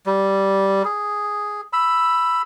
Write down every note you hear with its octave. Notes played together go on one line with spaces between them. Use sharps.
G3
G#4
B5 E6